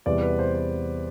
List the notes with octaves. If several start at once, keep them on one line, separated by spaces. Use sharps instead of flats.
E2 C3 G3 B3 D5
B4
C5
C5